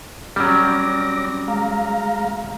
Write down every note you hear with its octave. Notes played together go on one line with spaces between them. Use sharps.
F#3 G3 C#4 D6 A#6
G#3 F5 A#5